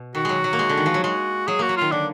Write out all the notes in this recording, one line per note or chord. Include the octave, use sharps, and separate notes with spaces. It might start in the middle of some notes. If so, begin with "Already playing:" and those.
Already playing: B2
D#3 F#4
F#3 G#3
F#3
A#3
G#3
D3
D#3
F3
F#3
G#3 F#4
F#3 G#4
A#3 F#4
F#3
D#3 F4
D3 D4